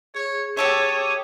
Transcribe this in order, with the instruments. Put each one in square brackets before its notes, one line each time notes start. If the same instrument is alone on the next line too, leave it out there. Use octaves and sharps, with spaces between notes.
[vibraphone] G#4 [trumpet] C#5
[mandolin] G4 A4 E5 [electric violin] C#5 [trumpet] D#6